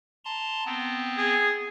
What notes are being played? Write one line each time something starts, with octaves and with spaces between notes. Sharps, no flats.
A5 A#5 C6
B3 C4
G#4